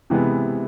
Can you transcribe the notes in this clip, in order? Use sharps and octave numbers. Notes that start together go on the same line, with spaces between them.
C3 E3 G#3 B3